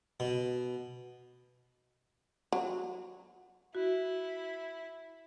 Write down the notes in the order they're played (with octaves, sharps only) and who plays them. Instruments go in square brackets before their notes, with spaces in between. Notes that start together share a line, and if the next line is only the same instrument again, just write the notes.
[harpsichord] B2
[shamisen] F#3
[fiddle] E4 [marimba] F#4